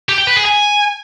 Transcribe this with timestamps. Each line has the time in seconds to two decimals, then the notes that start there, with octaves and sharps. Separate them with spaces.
0.09 G4
0.18 G5
0.27 B4
0.36 G#4
0.45 G#5